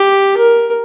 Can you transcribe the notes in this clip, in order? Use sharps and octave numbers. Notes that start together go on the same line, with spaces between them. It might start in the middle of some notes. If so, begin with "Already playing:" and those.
Already playing: G4
A#4